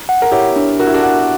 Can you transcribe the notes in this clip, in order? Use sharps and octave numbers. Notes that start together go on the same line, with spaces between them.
F#5
A#4
E4 G4 C#5
D4
F#4 A#4
E4
D4 F#4
F#5